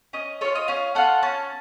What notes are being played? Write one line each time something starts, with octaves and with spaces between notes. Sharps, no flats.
C#4 D#5
F4 A4 C#5
D#5
C#4 F5
F4 A4 F#5
C#4 A5